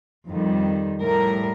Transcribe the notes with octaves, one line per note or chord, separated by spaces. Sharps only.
F2 D#3 G3
A2 G3 A#4